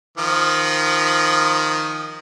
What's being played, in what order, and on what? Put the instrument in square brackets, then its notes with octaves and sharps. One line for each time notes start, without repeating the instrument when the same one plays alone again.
[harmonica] D#3 F3